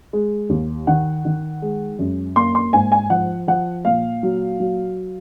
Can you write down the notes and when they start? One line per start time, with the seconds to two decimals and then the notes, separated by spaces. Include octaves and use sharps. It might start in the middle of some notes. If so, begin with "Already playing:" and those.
0.13 G#3
0.49 D#2
0.87 D#3 F#5
1.25 D#3
1.62 G#3
1.99 F#2
2.36 A#3 C6
2.55 C6
2.73 G#2 G#5
2.92 G#5
3.10 F3 F#5
3.48 F3 F#5
3.85 A#2 F5
4.23 F#3
4.60 F#3